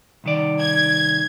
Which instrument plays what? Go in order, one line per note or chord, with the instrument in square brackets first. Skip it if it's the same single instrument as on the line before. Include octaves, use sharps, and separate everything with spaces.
[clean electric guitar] C2 D#3 D5
[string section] G#6